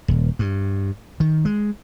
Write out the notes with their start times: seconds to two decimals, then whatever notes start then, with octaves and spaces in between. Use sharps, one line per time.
0.08 D#1
0.39 G2
1.20 D#3
1.45 G#3